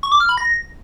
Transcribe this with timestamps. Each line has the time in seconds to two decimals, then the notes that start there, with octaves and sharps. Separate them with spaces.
0.03 C#6
0.12 D6
0.20 F6
0.29 B5
0.38 A#6